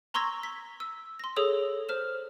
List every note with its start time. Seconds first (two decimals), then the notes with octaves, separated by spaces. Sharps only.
0.14 A#5 C6 C#6 E6 G#6 A#6
0.43 B6
0.80 E6
1.19 C6 A#6
1.36 G#4 A4 C#5 D#6 E6
1.89 C5 F6 E7